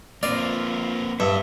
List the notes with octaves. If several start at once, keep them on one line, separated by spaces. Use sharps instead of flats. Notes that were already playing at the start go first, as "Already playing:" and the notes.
A#3 C4 F4 D5
G2 A4 D5 E5